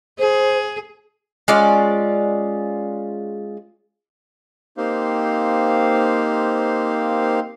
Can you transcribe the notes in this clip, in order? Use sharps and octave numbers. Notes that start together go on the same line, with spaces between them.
G#4 C5
G#3 C#4 F4 D5
A#3 C4 D#4 G4 C5 F5